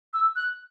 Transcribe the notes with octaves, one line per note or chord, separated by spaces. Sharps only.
E6
F#6